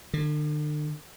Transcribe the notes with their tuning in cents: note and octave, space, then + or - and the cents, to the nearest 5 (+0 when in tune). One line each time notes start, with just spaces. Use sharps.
D3 +40